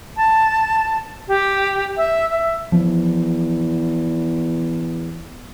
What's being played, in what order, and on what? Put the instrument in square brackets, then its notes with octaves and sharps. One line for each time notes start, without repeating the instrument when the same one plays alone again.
[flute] A5
G4
E5
E5
[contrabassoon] E2 [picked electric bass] F3